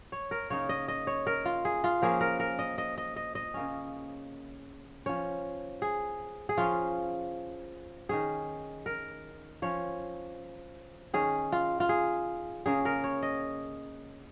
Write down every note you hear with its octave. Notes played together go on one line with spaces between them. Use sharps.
C#5
A#4
C#3 A#3 D#4 C#5
D#5
D#5
C#5
A#4
F4
G#4
F4
F3 A#3 C#4 G#4
A#4
A#4
D#5
D#5
D#5
D#5
D#5
C#3 A#3 C#4
F3 C#4 C#5
G#4
G#4
F3 C#4 F4
D#3 C#4 G#4
A#4
F3 C#4 C#5
D#3 C#4 G#4
F4
F4
G#4
C#3 A#3 C#4 G#4
A#4
C#5
D#5